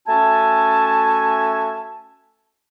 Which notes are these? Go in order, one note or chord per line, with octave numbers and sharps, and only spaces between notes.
A3 C#4 F#4 E5 G#5 A5